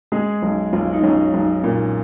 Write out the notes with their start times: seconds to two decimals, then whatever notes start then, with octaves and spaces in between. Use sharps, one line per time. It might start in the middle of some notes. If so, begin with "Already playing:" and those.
0.12 G#3 G#4
0.42 B1
0.73 B1 F4
0.93 D#4
1.03 B1 C#4
1.34 B1
1.64 A#2